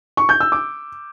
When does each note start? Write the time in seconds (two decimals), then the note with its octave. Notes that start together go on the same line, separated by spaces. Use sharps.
0.17 C#6
0.29 G6
0.40 E6
0.52 D6